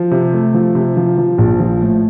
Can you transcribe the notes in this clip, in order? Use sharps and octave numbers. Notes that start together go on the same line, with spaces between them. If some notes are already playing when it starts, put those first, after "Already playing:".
Already playing: F3
C3
A3
F3
C3
F3
F3
A#1
F3
A2